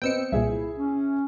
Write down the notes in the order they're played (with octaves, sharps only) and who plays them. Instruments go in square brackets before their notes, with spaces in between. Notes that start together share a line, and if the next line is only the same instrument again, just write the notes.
[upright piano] B3 C4 D#5 [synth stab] G5 E6 C#7
[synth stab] C2 A#2 [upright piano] G#4 E5
[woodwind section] E4
C#4